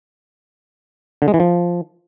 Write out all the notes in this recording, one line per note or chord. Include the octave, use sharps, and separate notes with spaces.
D3
G#3
E3
F3